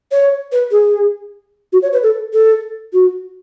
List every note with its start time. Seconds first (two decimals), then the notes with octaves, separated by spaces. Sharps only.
0.12 C#5
0.52 B4
0.71 G#4
1.73 F#4
1.82 C#5
1.93 B4
2.03 A4
2.33 A4
2.93 F#4